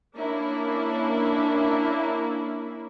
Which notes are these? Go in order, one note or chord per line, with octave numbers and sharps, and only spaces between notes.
A#3 C#4 D4 E4